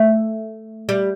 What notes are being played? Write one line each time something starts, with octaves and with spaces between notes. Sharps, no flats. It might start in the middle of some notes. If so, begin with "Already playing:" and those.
Already playing: A3
G3